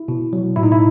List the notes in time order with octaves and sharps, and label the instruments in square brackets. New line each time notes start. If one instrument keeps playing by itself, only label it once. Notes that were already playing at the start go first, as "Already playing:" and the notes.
Already playing: [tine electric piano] E4
B2
F#3
A2 E4
D#4
E4